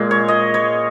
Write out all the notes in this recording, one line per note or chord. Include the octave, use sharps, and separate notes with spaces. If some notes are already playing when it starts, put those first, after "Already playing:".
Already playing: A#2 G#3
C#5
D#5
C#5